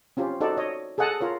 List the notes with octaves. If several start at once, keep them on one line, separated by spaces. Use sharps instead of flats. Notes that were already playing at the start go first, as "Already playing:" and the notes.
C4 C#4 F4 G4
D#4 F#4 A4 C5 D5
C#5 D#5
G#4 A4 D#5 F#5 G#5 A5
F4 A#4 C#5